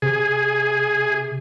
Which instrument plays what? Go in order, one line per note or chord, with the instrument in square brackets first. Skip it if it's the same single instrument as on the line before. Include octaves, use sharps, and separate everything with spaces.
[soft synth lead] C3 [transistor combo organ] G#4